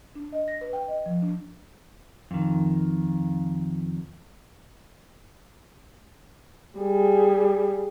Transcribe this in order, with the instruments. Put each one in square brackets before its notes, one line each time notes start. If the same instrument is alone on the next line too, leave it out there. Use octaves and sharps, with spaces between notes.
[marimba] D4
D#5
A#6
B4
G5
D#5
F3
D4
[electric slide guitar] F2 D#3
[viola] G3 G#4